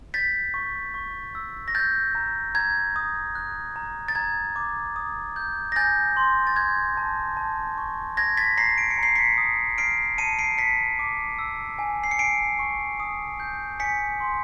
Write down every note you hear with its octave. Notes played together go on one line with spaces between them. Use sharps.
G6 A6 B6
C#6
C#6
E6
A#6
F#6 G6 A6
A#5
A#5 G#6
D#6
F#6
A#5
A6
A#5 G#6
D6
D#6
G6
A#6
G#5 G6 A6
C6
A6
F#6 G#6
A5
A5
C#6
F#6 G#6 A#6
A6 B6
A#5 A#6 C7
D7
C#7
A#5
C7
B6 C#7
D#6
F6 C7 D7
A5 C#7 D#7
C7 D7
A5 B6 C#7
D6
E6
G#5
C7
C#7
G#5 C7 D7
C#6
D#6
G6
G#5 B6 C#7
C6